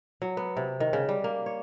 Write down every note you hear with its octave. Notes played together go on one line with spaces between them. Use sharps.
F#3
B3
C3
D#3
C#3
G3
A#3
C#5